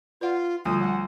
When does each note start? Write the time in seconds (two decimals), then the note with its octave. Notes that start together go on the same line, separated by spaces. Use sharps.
0.21 F4 B4 D5 F#5
0.65 D2 F3 G3 F4 D#6
0.80 G3 A3 F#5 G#5